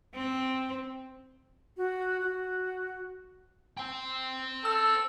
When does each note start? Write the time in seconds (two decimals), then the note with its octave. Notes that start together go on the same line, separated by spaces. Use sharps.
0.15 C4
1.77 F#4
2.20 F#4
3.77 C5 G5
4.65 A4 E6